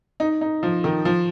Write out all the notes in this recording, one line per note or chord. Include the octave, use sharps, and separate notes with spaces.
D#4
D#4
F3
D#3
F3